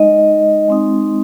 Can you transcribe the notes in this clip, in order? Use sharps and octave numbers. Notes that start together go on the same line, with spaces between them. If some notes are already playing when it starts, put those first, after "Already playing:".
Already playing: G#3 D#4 D#5
G#3 C4 D#4